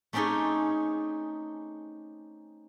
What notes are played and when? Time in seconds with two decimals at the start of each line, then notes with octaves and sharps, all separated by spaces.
0.13 A3 C4 C#4 D#4 G4 G#4